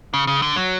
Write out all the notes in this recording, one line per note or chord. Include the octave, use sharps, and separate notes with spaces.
C#3
C#3
D3
F#3